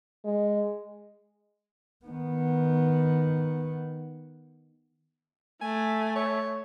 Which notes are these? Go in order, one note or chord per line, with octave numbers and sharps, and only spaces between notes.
G#3
D#3 B3
A3 G#5
C#5